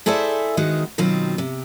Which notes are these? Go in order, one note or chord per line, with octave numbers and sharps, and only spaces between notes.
E4 G#4 A4 C5 D5 E5
D#3 G#3 B3 F#4
B2 D#3 F#3 C4 F4
C3